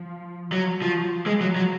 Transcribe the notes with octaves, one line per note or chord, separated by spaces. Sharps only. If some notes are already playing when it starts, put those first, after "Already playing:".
Already playing: F3
F3 F#3
F3 F#3
F3
G#3
F3 F#3
F#3